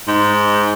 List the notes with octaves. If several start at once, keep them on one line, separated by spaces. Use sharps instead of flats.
G#2